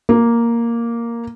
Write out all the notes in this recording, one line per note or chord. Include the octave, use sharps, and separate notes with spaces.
A#3